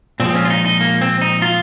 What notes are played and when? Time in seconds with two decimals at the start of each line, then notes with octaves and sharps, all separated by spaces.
0.20 A#2 F3 G#3 C4
0.30 C4
0.35 C#4
0.45 F4
0.50 D#4
0.66 D#4
0.81 A#3
1.02 C4
1.21 D#4
1.42 F4